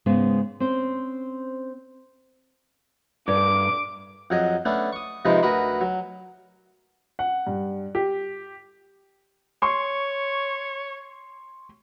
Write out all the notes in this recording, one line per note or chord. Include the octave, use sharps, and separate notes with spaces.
G#2 C#3 G#3 B3 C#4
C4 C#4 C5
G2 D6
F2 F#3 G#4 D#5
A3 B3 C#4 D4
C#6 D#6
C3 F3 G#3 D#4 B4
D2 F#4 A#4 B4 B5 D#6
F#3
F#5
G2
G4
C#5 C6 C#6